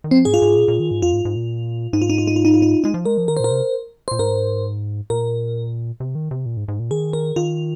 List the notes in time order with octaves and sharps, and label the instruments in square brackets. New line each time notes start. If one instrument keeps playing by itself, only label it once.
[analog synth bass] D#3
[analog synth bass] F3 [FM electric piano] C4
[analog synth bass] G#2 [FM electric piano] G#4
[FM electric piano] F4
[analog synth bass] G#2
A#2
A#2
D#3
G#2
[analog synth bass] F2 [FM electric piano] F4
[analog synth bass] G#2
G#2
A#2
[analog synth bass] G#2 [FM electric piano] D#4
[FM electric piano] F4
D#4
F4
D#4
F4
D#4
F4
D#4
[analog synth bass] G#3 [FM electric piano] D#4
[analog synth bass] F3
[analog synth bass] G#3 [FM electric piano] A#4
[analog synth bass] F3
[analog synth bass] D#3 [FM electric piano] A#4
[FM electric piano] C5
[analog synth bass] A#2 [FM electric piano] A#4
[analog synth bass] C3
[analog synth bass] A#2 [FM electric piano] C5
[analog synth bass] G#2 [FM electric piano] A#4
[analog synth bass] A#2 [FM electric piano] A#4
[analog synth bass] C3
D#3
C3
A#2
G#2
G#2
A#2
[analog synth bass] D#3 [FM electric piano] G#4
[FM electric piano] A#4
[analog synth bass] D#3 [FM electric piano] F4